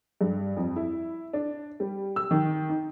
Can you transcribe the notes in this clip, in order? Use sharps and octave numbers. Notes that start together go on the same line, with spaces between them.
G2
F2
E4
D4
G3
E6
D#3
D#4